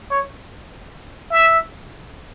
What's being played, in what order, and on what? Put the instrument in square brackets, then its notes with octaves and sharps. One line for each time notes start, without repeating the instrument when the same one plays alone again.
[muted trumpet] C#5
E5